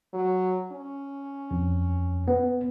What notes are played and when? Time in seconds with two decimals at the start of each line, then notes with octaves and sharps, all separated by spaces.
0.13 F#3
0.72 C#4
1.51 F2
2.28 B3